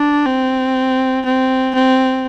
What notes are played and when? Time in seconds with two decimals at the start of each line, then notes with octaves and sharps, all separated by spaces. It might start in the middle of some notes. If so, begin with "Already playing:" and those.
Already playing: D4
0.26 C4
1.26 C4
1.75 C4